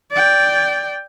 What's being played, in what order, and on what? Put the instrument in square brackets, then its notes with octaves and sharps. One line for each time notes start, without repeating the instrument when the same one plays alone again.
[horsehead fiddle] D5 G5